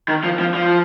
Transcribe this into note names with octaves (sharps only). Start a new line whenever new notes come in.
D#3
F3
F3
F3